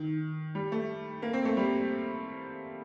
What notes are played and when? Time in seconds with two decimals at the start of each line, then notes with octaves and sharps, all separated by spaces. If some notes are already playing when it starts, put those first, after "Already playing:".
Already playing: D#3
0.55 G3
0.72 A3
1.22 A#3
1.33 C4
1.45 A3
1.57 G3